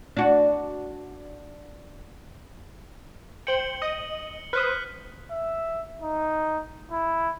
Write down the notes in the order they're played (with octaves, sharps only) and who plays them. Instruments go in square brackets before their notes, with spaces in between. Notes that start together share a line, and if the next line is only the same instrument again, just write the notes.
[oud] D4 F#4
[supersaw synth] C5 G5 [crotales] C#7 F#7 G7
[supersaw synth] D#5 D#6
[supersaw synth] B4 C5 D#6 [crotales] F6 F#6 B6
[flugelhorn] E5
D#4
E4